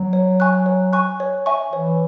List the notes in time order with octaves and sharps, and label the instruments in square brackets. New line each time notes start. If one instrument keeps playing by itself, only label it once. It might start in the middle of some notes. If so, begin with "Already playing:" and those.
Already playing: [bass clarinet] F#3
[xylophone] C#5
G#5 C#6 F#6
C#5
G#5 C#6 F#6
C#5
E5 G#5 C#6
[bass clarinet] E3 [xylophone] C#5